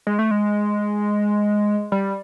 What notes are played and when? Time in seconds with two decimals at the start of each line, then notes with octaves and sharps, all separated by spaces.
0.07 G#3
0.19 A3
0.31 G#3
1.92 G3